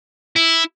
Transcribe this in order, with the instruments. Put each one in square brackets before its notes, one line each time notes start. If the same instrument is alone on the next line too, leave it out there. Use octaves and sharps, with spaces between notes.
[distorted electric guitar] E4